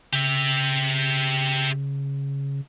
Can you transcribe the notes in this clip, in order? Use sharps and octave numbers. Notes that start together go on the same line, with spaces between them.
C#3 G4 E5